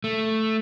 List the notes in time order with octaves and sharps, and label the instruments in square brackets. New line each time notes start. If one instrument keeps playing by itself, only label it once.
[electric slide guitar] A3